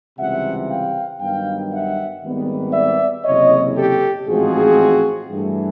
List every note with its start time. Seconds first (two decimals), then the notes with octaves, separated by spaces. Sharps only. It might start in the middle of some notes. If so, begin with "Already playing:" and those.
0.18 C#2 C3 E3 G3 E5 F#5
0.69 F5 G5
1.20 G2 D#3 F#3 B3 F5 G5
1.72 E5 F#5
2.23 G#1 G#2 D#3 G3 B3
2.73 D5 E5
3.24 F#1 E2 C3 C#5 D#5
3.75 G4 A4
4.27 A1 G#2 F3 G#3 C4 F#4 G#4
5.29 G2 E3 A3